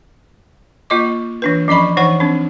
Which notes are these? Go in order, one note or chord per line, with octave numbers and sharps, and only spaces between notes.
A#3 F4 D#5 D6
E3 D4 B4
F3 C#4 D#5 B5 C#6
E3 D#4 C5 F#5 C#6
C4 D4